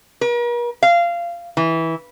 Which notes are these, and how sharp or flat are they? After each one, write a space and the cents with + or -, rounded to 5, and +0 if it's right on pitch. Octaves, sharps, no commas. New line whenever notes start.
A#4 +45
F5 -20
E3 -15